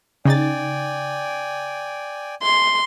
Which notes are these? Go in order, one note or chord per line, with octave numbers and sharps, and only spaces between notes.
C#3 D#4 D5 G5 G#5 A6
C6